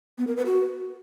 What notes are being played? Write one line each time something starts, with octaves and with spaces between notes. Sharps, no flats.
B3
A#4
B4
F#4